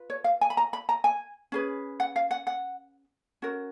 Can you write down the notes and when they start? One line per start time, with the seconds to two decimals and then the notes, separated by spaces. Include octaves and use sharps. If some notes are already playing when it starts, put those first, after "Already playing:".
Already playing: F4 B4
0.10 C#5
0.24 F5
0.41 G#5
0.50 B5
0.57 A#5
0.73 B5
0.89 A#5
1.04 G#5
1.52 C#4 G#4 B4
2.00 F#5
2.16 F5
2.31 F#5
2.47 F#5
3.42 C#4 F#4 A#4